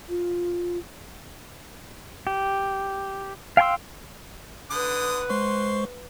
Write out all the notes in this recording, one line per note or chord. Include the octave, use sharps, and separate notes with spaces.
F4
G4
F5 G5 G#5 C6 E6
D3 B4 F#5 D#6
G#3 C5 C6 C#6